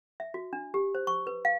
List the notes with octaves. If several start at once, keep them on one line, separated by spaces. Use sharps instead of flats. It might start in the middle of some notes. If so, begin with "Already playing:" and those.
E5
F#4
D4
G4
C5
C#6
B4
F5